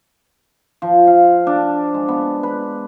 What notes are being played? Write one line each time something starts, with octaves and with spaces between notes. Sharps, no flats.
F3
F5
D4
G#3
B3
B4